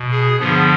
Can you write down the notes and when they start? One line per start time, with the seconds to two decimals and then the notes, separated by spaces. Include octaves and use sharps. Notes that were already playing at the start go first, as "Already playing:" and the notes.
Already playing: B2
0.11 G#4
0.39 G2 D3 F3 B3